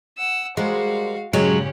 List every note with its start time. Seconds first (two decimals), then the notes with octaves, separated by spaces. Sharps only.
0.18 F#5 E6
0.57 G3 G#3 F#4 A#4 C5 F5
1.33 G2 A#2 C#3 F#3 G#3 C#4 G4